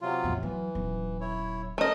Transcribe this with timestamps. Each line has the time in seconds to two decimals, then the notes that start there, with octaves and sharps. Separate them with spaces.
0.01 C3 F#3 F4
0.24 E2 A2
0.43 E3 F#3
0.75 D#1 F#3
1.21 E4 C#5
1.78 A3 A#4 D#5